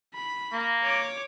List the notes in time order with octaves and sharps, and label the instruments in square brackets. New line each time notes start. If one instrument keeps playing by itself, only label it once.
[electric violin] B5
[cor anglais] A#3
[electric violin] C#5 D6